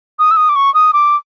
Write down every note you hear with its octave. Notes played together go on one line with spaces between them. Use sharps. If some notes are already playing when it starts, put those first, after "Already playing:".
D#6
E6
D#6
D6
C#6
D#6
D6